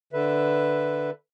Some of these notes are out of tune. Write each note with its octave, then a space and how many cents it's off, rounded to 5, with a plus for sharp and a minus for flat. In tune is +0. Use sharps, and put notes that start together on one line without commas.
D3 +0 B4 +0 E5 +0